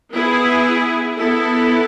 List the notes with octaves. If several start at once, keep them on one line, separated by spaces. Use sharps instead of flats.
B3 E4 G#4
B3 E4 A4